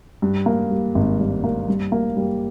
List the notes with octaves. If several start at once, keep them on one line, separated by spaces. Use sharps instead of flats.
G2
A#3
G3
G#1
G2
A#3
G2
A#3
G3